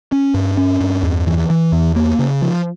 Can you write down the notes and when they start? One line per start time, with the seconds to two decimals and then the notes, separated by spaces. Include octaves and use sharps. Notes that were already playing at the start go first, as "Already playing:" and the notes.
0.12 C#4
0.34 G2
0.57 C#4
0.81 G2
1.03 E2
1.27 E3
1.50 E3
1.72 E2
1.96 A#3
2.19 C#3
2.42 F3